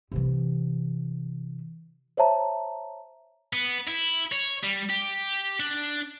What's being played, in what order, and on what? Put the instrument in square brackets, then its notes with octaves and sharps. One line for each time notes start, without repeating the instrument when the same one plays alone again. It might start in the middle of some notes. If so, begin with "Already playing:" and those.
[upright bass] C3 E3
[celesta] C5 C#5 E5 A5 A#5
[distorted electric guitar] B3
E4
C#5
G3
G4
D4